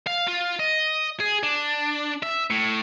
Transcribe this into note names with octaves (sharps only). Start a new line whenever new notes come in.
F5
F4
D#5
G#4
D4
E5
A2